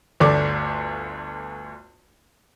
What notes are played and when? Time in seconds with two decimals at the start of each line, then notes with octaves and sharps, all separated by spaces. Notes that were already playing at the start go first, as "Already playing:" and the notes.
0.20 G1 D2 A3 D5 D6